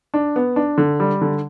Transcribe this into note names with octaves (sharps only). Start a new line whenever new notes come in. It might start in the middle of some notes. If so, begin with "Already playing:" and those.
D4
B3
D4
D3
G3
D3